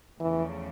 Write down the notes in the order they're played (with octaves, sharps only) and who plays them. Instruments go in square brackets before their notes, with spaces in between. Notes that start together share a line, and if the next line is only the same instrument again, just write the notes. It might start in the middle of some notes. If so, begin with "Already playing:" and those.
[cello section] E2 C#3 F3 A3 [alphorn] E3